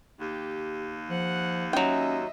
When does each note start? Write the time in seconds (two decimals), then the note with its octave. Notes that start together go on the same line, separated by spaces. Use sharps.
0.20 D#2 G4
1.11 F3 F#5
1.73 F#3 C#4 D#5 E5 G5